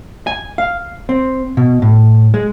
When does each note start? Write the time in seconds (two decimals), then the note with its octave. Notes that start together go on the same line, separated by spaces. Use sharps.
0.27 G#5
0.58 F5
1.09 C4
1.57 B2
1.82 A2
2.34 G#3